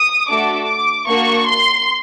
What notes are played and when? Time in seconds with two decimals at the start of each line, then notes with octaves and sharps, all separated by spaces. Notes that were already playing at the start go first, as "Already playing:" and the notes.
Already playing: D#6
0.28 A3 D4 F#4 A4 D6
0.68 D6
1.07 A#3 D4 F#4 C#6
1.46 C6